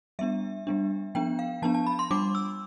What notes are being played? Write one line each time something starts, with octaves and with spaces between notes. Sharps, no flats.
G3 B3 D4 E5
G3 B3 D4
F3 B3 D4 G5
F5
F3 B3 D4 A5
A5
B5
C6
G3 D4 D6
E6